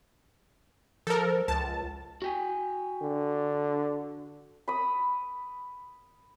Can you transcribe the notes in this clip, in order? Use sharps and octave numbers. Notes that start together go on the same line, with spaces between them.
F3 A4 A#4
C#2 A5
F#4 G5 G#5
D3
B5 D#6